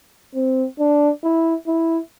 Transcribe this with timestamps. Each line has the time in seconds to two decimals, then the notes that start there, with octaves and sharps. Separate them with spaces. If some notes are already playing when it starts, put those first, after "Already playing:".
0.35 C4
0.80 D4
1.24 E4
1.67 E4